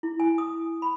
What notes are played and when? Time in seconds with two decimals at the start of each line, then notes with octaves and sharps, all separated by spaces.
0.03 E4
0.20 G#5
0.38 D#6
0.82 B5